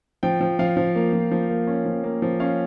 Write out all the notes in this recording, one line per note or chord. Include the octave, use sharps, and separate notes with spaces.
F3 G5
F3
F3 F5
F3
A#3
F3
F3
A#3
C#4
F3
A#3
F3
C#4 F5